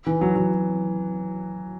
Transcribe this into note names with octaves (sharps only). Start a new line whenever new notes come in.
E3
F#3
F#3